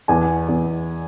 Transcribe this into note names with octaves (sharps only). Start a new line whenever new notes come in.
E2 G#5
E2